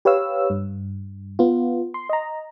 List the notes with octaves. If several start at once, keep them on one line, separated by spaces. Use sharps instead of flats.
G4 B4 C#5 F5 E6
G2
B3 F4
C6
D#5 A#5